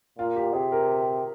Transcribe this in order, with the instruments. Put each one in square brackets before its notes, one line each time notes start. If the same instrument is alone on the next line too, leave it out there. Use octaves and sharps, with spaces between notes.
[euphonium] A#2 [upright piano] F4
[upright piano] G4
[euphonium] C3 [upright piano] G#4
[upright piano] A#4